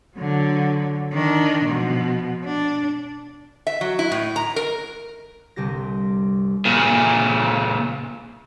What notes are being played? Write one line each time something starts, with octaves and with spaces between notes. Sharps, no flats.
D3 F#3
D#3 D4
B2 F3
D4
E5
F#3
E4
A2
A#5
A#4
G1 C2 C3 G4 A#6
A#2 C#3